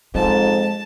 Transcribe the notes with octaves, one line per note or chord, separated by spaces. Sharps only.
F2 G#2 G#3 A5